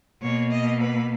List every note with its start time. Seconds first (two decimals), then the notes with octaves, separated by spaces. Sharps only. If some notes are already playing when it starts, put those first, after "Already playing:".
0.22 B2 A#3 C#5
0.51 D#5
0.81 B4